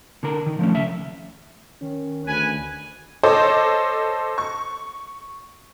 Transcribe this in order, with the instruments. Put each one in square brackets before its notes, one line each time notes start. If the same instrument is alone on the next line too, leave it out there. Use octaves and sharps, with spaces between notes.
[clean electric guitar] D3 D4 A#4
D#3
F3 A3 C#4
C#2 E5
[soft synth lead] D#3 [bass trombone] C#4
[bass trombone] D2 [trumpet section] B4 G#5
[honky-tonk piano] A4 C5 C#5 D#5 C6 D6
C#6